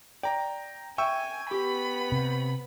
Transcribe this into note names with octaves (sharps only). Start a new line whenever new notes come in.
D5 G5 A#5
E5 G5 G#5 C#6 E6
B3 G4 B5
C3